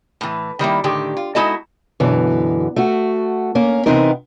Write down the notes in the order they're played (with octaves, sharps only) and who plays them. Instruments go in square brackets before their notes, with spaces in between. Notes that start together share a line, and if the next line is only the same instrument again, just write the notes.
[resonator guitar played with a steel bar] A2 E3
D#3 G3 A#3 E4
A2 D3 D#3 G4
F4
G#3 D#4 E4 F#4 A4 D#5
[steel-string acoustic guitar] F#2 B2 D3 E3
A3 F#4
A#3 C#4 A#4
C3 E3 B3 C4 D#4 A#4